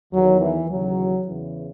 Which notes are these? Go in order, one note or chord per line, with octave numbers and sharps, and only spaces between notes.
E2 D#3 F#3
E3
D#2 C#3 E3 F#3
E2 C#3 E3